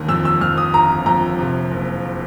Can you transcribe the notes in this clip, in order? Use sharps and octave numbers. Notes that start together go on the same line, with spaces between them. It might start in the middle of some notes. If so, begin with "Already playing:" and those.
Already playing: E1 D#2
F2 E6
E6
F2 F6
D#6
G1 A#5
F2 A#5
C3
F#1